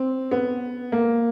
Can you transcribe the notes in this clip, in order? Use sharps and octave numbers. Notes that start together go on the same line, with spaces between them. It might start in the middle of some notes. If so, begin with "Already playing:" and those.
Already playing: C4
B3
A#3